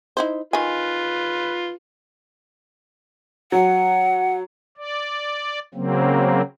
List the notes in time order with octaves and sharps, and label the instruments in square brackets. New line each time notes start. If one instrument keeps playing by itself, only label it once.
[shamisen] D#4 E4 C5
[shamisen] D#3 G#5 [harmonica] F4 B4
[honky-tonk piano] F#3 [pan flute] F#5
[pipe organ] D5
C#3 F#3 A#3 C4